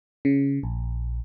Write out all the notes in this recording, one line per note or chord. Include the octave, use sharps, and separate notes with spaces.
C#3
A#1